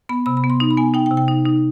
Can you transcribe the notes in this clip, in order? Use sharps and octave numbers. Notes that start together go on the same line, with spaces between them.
B3 B5
C3 B5
B5
B3
C6
D#4
B5
B3 G#5
D#4 G5
G5
C3
G5
D#4
D#4